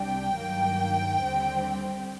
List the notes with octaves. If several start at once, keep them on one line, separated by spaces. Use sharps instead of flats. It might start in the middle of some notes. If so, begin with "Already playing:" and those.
Already playing: C2 C3 G3 D4 G5
G2 D#3 F#3 A#3
D#2 D3 G3 C4